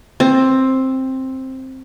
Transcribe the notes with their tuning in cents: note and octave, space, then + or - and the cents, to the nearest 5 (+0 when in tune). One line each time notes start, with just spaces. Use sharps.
C4 +10